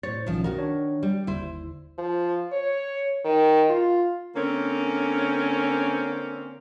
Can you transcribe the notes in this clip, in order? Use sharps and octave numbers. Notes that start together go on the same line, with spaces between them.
A2 C5 C#5 A6
B1 D#3 F3 C#4
D#3 F#4 A#4
D4 C#5
G3
G1 D#2 E4 C5
F3
C#5
D#3
F4
D3 A#3 C4 C#4